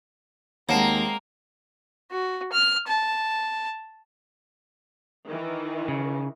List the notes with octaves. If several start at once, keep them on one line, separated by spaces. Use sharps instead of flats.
D#2 G#3 A#3 C4 C#5 F#5 A5
F#4
F6
A5
D#3 E3
C#3